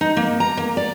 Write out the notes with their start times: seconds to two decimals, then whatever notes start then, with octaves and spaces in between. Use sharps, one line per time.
0.01 D#4
0.17 A#3
0.40 A#5
0.57 A#3
0.77 D5